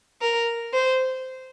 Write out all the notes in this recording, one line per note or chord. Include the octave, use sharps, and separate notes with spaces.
A#4
C5